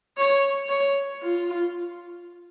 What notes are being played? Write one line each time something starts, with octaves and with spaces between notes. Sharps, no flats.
C#5
C#5
F4